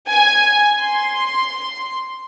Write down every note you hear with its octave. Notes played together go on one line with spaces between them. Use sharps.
G#5
C6